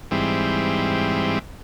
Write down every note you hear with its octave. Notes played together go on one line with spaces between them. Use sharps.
G#2 E3 G3 C4